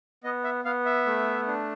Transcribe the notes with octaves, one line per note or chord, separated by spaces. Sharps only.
B3 D#5
E5
B3 F5
E5
A3
D4